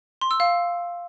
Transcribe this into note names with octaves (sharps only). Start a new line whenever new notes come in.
C6
E6
F5